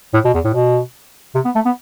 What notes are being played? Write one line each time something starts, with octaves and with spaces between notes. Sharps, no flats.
A2
B2
E2
A2
B2
C3
B3
A3
B3